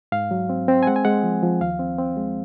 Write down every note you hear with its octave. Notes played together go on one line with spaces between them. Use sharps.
G#2 F5
F#3
C4
C4
G#5
G#3 F#5
G#5
G#3 F#5
F3
F3
D#2 F5
C4
C4
G#3